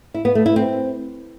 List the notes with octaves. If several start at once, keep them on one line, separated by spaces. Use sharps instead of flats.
E4
B3
A3
E4
C4